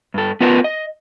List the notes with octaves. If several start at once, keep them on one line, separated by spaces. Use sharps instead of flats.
G2 A4
B3 F4 A#4 B4 D#5 A5
D#5